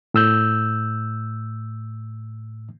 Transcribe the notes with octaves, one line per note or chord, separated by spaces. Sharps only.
A2 E6 G6